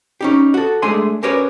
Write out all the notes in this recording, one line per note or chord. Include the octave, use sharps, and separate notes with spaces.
C#4 D#4 G4
F#4 A4
G#3 A3 D4 G#4 G#5 C6
C#4 F#4 G4 A#4 B4 C#5